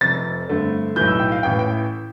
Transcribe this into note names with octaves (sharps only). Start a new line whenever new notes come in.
F1 F2 C3 A6
G2 D3 A3 C4
B1 A2 E3 G6
E6
G5
F5
A1 A2 E3 G5
G5